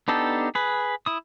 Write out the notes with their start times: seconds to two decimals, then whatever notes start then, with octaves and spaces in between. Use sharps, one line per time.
0.08 B3 D4 D#4 G4 A4
0.55 G#4 B4
1.06 E4 D#6